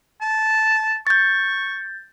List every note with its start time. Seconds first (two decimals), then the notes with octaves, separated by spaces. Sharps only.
0.21 A5
1.07 C#6 G6 A6